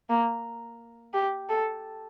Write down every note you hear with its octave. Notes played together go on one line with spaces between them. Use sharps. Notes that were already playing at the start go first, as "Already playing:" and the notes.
A#3
G4
A4